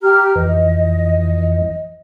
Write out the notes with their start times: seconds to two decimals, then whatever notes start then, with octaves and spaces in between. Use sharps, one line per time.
0.03 G4 A#5 F6
0.36 F2 E3 D#5